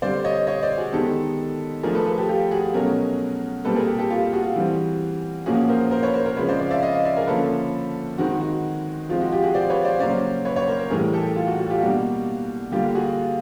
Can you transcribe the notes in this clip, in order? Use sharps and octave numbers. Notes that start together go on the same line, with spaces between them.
D3 G3 C4 C5 D5
C#5 D#5
C#5 D#5
C5 D5
F#4 G#4
D#3 G#3 B3 G4 A4
F3 A3 D4 G#4 A#4
A4 B4
A4 B4
G4 A4
F4 G4
F#4 G#4
B2 F#3 A3 C#4 G#4 A#4
A#2 G3 C4 A4 B4
G#4 A#4
G4 A4
G4 A4
F4 G4
F#4 G#4
E3 G3 C4
A#2 F3 A#3 C#4 F#4 G#4
A#4 C5
A#4 C5
B4 C#5
A#4 C5
A#4 C5
C#3 F3 G#3 C4 B4 C#5
C5 D5
C5 D5
F5
D5 E5
D#5 F5
D#5 F5
D5 E5
G#4 A#4
D3 F3 A#3 C#4 A4 B4
D#3 G#3 C4 F#4
F#4
F3 G#3 C4 F4
F#4
F4 G4
F#4 G#4
C5 D5
B4 C#5
C5 D5
C#3 F#3 A#3 C#4 C5 D5
B4 C#5
B4 C#5
A#4 C5
A#4 C5
A2 E3 G3 G#4 A#4
G4 A4
F4
F#4
F#4
F4 G4
B2 G3 A#3 D4 F#4
D3 G3 A#3 F4 G4
F#4 G#4
F#4